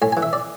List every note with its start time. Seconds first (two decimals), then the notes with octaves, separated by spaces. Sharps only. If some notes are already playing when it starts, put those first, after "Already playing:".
0.02 A2 G#5
0.12 G#5
0.17 E3
0.22 E5
0.33 D5